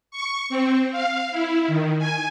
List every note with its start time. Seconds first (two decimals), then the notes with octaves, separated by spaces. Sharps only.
0.11 C#6
0.49 C4
0.92 F5
1.31 E4
1.68 D#3
1.98 G#5